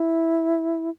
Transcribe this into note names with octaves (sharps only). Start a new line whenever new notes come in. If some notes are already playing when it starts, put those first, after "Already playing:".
Already playing: E4